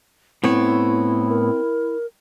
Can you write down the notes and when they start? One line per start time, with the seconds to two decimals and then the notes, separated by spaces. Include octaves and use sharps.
0.44 A2 B3 C4 E4 C#5
1.29 A#4